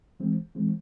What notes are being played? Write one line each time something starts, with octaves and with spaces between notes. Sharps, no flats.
E3 G#3 C4
E3 G#3 C4